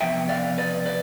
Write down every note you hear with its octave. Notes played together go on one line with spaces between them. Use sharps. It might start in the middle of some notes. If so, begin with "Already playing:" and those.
C3 F3 B3 E5 G5
D5 F5
B4 D5
B4 D5